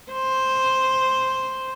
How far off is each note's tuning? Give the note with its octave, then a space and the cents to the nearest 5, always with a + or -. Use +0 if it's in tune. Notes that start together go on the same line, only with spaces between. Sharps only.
C5 +0